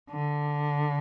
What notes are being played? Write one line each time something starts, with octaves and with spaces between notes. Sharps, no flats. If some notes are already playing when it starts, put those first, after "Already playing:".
D3